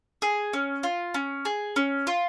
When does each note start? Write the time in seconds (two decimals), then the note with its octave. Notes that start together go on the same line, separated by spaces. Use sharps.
0.22 G#4
0.53 C#4
0.83 F4
1.14 C#4
1.45 G#4
1.76 C#4
2.07 F4